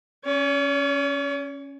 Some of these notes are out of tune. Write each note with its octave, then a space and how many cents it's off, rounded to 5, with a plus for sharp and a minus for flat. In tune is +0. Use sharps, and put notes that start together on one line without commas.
C#4 +0 C#5 +45